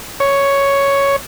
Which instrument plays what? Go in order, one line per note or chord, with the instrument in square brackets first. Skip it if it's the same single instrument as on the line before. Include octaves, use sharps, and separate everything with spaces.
[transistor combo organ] C#5